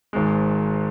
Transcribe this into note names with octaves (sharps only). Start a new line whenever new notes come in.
G#1 G#2 G#3